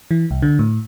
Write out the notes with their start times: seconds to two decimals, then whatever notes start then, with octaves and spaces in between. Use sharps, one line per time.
0.11 E3
0.31 C2
0.42 D3
0.59 A2